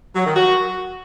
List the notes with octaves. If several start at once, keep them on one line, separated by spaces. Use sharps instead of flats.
F#3
D#3
F#4